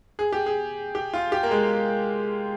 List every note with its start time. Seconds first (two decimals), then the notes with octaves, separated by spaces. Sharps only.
0.19 G#4
0.33 G4
0.46 G#4
0.95 G4
1.14 F4
1.32 G4
1.43 A#3
1.51 G#3